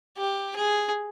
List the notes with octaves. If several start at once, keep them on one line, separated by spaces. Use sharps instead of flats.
G4
G#4